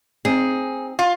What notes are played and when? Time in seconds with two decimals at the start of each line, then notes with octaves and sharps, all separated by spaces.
0.25 C4 D#4 G#4
0.99 F4